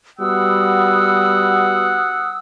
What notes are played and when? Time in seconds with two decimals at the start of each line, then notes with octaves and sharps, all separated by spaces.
0.19 G3 B3 F#4 F#5 D#6 E6